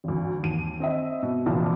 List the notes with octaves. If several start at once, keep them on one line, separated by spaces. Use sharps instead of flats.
G#1 D2
D#2 D#7
C4 D#5 E5
B2
F1 D2 A#2 E3 A5